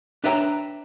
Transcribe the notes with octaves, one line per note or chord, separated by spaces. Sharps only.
D4 B4 C#5 E5 G5 A#5